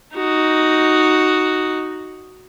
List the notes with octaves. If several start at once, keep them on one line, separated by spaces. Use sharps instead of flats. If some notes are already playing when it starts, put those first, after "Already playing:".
D#4 F#4